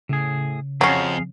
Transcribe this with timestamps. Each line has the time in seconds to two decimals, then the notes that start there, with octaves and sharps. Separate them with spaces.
0.09 A2 C#3 G#4
0.81 F2 F#3 C#4 G#4 F5